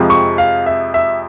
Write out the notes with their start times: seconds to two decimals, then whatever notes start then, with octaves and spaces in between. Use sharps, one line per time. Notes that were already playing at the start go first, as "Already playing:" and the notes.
Already playing: F2 C3 F3 G#3
0.10 C#6
0.38 F5
0.66 E5
0.94 E5